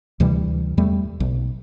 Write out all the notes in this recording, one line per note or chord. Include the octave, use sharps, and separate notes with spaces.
D2 C3 E3 G3
E2 G3 A3
B1